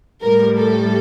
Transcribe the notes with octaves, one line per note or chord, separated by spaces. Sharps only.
A2 G3 A#4
A4